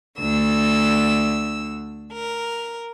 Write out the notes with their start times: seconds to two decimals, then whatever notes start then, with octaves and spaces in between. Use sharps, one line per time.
0.18 D2 D3 E6
2.12 A#4